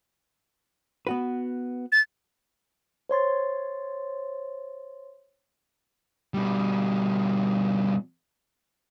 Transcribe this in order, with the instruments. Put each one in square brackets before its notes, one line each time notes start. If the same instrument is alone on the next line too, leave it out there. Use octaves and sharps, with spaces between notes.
[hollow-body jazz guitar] B3 F#4 B4
[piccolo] A6
[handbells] C5 C#5 C6 A6
[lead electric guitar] B2 G3